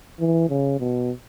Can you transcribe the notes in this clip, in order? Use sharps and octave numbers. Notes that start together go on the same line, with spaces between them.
E3
C#3
B2